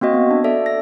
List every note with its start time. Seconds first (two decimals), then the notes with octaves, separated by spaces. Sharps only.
0.01 A#3 C4 F#4 D#5
0.14 B3
0.31 D4
0.44 A4 D5 E5
0.66 A#6